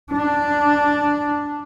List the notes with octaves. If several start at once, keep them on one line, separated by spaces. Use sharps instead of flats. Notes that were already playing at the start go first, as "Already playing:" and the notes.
D4